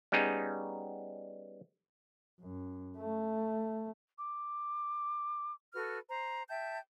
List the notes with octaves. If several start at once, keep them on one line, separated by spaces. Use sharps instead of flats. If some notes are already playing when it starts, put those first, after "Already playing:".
G3 B3 C#4 D#4 G#4
F#2
A3
D6
F#4 A4 B4 F6
C5 A#5
E5 G5 A5 G6